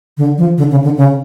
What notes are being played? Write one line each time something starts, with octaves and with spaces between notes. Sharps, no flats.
D3
F3
D3
C#3
D3
C#3